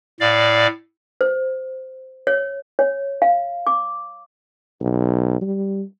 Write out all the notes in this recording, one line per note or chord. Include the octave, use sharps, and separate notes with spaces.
A2 D5 F5
C5
C#5
C#5
F5
D6
B1
G3